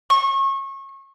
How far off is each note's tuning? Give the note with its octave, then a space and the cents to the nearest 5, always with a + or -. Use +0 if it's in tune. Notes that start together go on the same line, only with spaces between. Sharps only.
C#6 -30